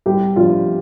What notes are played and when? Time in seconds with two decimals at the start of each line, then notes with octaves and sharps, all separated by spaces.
0.06 C2 G4
0.36 C3 F3 D4 F4